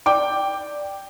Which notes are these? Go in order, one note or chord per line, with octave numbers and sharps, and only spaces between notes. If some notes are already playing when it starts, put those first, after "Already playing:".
D5 G5 D6